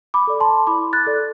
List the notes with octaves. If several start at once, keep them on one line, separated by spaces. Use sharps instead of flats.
B5 D6
A4 D5
A5 C6
E4 B5 D6
F#6 A6
A4 D5